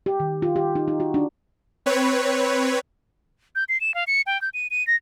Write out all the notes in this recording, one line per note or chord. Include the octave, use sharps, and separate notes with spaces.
G4
D#3
F4
G4
D#4
D#4
F#4
D4
C4 B4 C#5
G6
C7
E7
F5
C#7
G5
G6
D#7
D#7
A#6